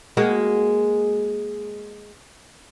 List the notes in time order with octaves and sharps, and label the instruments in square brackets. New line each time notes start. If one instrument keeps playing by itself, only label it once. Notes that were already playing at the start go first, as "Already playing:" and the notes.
[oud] G#3 A#3 F#4